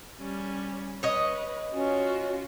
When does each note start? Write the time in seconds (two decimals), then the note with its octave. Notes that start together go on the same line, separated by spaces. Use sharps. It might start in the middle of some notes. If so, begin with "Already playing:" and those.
0.19 G3 C#4
1.03 B4 C#5 D#5
1.73 C#4 F4 F#4